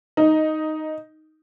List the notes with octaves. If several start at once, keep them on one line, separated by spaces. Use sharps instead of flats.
D#4